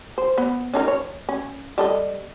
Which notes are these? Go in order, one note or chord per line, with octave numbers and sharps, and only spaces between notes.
C5
B3
C#4 D#4 A#4
C#5
C#4
G3 A4 D#5